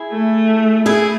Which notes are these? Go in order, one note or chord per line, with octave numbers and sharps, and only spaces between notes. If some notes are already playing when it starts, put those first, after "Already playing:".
Already playing: E4 G#4
A3
A3 E4 G#4